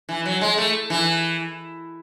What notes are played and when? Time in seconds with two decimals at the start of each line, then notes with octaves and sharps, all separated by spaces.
0.09 E3
0.26 F#3
0.41 G#3
0.58 A3
0.90 E3